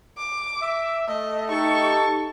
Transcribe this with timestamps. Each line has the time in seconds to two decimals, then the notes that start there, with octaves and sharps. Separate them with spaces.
0.18 D6
0.62 E5
1.08 A3 D#5
1.51 D#4 G4 A4 C#6